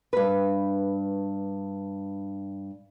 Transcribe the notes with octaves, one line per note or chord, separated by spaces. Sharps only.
G2 B4